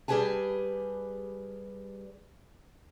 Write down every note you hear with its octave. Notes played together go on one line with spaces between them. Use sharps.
G3 G4 G#4 B4 G#5 A5